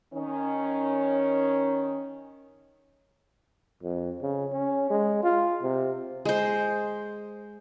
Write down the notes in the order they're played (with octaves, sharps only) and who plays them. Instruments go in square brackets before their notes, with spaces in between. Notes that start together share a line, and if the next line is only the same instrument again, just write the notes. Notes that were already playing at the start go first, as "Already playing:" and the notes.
[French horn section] D#3 C#4
[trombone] F2
C#3
C#4
G#3
F4
C3
[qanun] G#3 C5